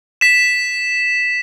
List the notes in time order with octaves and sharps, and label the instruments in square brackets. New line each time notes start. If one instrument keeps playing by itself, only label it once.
[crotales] B6 E7